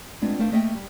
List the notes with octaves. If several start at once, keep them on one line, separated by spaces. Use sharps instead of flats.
G#3 A3 B3 C4 D4 F4
A3 D4 A#4 C5 F5
A3 A#3 D#5 E5 F#5 G5
G3